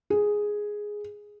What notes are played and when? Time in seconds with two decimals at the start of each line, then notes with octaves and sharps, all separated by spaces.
0.10 G#4